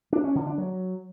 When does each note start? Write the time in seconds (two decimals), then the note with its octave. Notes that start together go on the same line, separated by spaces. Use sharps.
0.13 D4
0.24 C#4
0.35 D3
0.47 D4
0.58 F#3